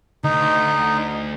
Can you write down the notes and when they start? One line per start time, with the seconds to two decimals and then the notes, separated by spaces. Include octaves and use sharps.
0.24 D2 D#4